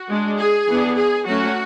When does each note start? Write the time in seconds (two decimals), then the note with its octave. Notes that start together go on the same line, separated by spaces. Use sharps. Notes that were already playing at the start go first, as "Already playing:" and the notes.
Already playing: F#4
0.09 G#3 D4
0.39 G#4
0.68 E3 B3 D4
0.97 G#4
1.26 F#3 A3 C#4 F#4